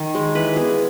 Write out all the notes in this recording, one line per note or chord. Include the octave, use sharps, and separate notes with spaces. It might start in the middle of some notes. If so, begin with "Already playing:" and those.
Already playing: D#3
G#3
E3 B4
B3 G#4